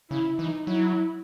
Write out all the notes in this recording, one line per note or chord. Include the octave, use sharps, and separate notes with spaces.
C#3 E4
E3 D#4
F#3 E4